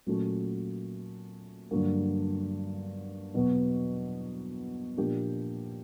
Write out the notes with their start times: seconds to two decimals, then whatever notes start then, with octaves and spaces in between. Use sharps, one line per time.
0.07 A#2 F#3 A3 C#4 F#4
1.71 G2 D3 F#3 A#3
3.34 E2 B2 F#3 B3
4.97 A#2 F3 A#3 D4 G4